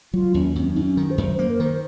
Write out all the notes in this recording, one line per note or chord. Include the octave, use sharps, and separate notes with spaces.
F#3 F4
D#2 C#4
F#2 C4 C#4
F#2 D#4
C#4
D#3
C5
F#2
A#3 C5
A#4
D#3 C5